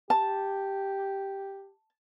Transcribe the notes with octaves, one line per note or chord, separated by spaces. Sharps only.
G4 A5